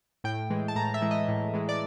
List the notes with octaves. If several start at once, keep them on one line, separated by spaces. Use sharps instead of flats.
A2 G5
E3 G#3
A5
A2 A#5
E5
E3 G#3
D#5
A2
E3 G#3
D5